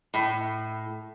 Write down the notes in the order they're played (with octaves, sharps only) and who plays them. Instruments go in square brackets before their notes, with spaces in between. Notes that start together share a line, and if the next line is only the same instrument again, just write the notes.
[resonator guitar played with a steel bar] A2